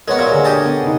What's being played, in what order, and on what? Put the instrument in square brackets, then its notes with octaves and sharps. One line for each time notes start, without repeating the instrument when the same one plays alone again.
[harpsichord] G#3 B3 [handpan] A#4 C#5 D#5
[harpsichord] A#2 F#3
[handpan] D3 G#4
[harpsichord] G4 D#5 A5
[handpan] B3
C3 D#4